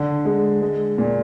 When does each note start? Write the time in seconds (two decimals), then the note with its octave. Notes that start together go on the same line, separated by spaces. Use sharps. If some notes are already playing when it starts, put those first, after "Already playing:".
Already playing: D3
0.25 G#3
0.62 G#3
0.98 A#2